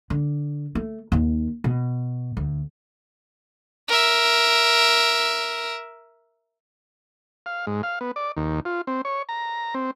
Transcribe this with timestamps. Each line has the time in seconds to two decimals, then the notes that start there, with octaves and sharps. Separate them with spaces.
0.10 D3
0.75 A3
1.12 D#2 D#3
1.64 B2
2.37 D2
3.88 A#4 E5
7.46 F5
7.67 G#2
7.83 F5
8.01 B3
8.16 D5
8.37 D#2
8.65 F4
8.87 C4
9.05 C#5
9.29 A#5
9.74 C4